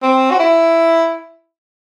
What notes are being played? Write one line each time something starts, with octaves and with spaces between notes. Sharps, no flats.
C4
F#4
E4